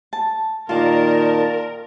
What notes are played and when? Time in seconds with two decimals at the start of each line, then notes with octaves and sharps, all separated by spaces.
0.13 A5
0.69 A#2 D#3 F4 A#4 D5 A5